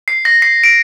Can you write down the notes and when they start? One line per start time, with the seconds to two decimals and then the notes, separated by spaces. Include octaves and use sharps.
0.08 C7
0.25 A#6
0.42 C7
0.64 D7